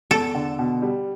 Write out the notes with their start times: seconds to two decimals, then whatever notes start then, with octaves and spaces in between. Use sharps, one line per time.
0.11 E2 A4
0.35 D3
0.59 B2
0.82 G3